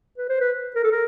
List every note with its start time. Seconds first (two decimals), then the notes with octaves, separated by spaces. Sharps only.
0.18 B4
0.29 C5
0.41 B4
0.75 A#4
0.84 A4
0.92 A#4